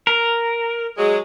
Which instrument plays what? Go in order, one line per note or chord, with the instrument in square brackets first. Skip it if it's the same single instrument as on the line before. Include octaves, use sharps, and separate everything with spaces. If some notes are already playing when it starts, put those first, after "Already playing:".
[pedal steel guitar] A#4
[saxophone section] F#3 G#3